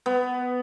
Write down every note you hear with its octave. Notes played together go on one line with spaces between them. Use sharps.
B3